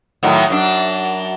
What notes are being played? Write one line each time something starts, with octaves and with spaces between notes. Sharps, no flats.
A2 D#3 F#3
F#2 D4